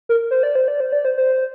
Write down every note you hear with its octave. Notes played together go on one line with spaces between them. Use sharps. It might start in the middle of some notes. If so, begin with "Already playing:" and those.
A#4
C5
D5
C5
D5
C5
D5
C5
C5